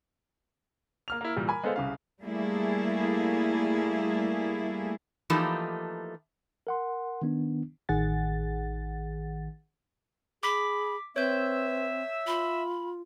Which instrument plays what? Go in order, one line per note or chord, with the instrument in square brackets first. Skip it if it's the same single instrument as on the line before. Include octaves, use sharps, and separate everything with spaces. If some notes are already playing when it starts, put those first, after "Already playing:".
[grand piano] A#3 F6 F7
A#3 E4
A#2 E3 G3
A#4 G#5 B5
G#3 B3 G#4 A4 C5 F5
C2 C#3 F5
[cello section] G3 A3 A#3 E4 G#4
[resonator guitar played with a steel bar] E3 F3 A3 A#3 D#4 G4
[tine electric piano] A#4 F#5 C6
D#3 B3 D4
[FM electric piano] A1 D#3 G#4 F#5 A6
[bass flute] G#4 [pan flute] B5 [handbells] D6 B6
[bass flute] C4 [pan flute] B4 [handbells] C#5 G6 [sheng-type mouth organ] E5 E6
[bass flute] F4 [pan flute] B5